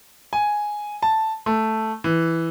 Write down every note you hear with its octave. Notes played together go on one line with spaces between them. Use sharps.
G#5
A5
A3
E3